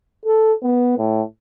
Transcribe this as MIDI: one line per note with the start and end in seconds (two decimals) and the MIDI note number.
0.25 0.54 69
0.63 0.97 59
0.98 1.22 45